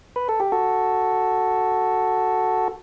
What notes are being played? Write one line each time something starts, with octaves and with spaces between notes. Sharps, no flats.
B4
A4
G4
F#4 A4